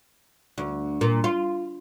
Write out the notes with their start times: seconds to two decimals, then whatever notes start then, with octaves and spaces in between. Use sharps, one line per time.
0.58 D2
1.01 A#2
1.24 F4